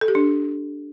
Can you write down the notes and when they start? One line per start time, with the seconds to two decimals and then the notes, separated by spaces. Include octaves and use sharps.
0.01 A4
0.08 G4
0.15 D4